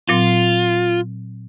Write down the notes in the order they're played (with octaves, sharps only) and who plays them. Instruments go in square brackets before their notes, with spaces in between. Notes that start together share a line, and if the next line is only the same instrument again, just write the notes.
[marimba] A#2 F#3 C4 [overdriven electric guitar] F4